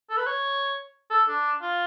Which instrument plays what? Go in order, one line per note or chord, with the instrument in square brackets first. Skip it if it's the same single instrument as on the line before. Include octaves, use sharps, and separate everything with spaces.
[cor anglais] A4
B4
C#5
A4
D4
F4